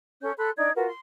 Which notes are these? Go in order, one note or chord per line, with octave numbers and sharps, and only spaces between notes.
C#4 A4 C#5 G6
A4 B5 C6 F#6
D4 D#4 D5 G#6
F4 F#4 A#4 B4
C6